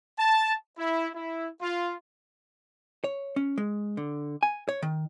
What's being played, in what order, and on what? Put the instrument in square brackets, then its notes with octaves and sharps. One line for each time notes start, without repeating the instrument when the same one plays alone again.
[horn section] A5
E4
E4
F4
[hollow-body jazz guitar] C#5
C#4
G#3
D3
G#5
C#5
D#3